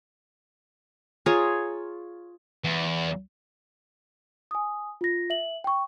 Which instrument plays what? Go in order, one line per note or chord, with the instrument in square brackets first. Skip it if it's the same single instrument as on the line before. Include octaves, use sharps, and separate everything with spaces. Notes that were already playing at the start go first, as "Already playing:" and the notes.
[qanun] F4 G#4 C#5 A#5
[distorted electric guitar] E2
[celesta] G#5 D#6
F4 A#6
E5 F#7
G5 C#6